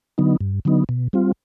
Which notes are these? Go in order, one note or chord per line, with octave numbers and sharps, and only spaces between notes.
D3 F#3 B3 D#4
G2
D3 F#3 B3 D#4
B2
G3 C4 F4